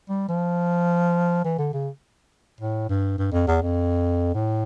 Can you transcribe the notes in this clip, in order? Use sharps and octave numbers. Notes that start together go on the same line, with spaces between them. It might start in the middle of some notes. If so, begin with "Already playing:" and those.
G3
F3
E3
D3
C#3
A2
G2
G2
F2
E2
F2
A2